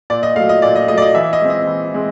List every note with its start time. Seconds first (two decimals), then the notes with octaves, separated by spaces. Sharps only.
0.10 A#2 D5
0.23 D#5
0.36 F#3 A3 F5
0.49 D#5
0.62 A#2 D5
0.76 D#5
0.88 F#3 A3 D#5
0.98 D5
1.02 D#5
1.15 E3 E5
1.33 D#5
1.41 G#3 C4
1.50 D#5
1.67 E3
1.94 G#3 C4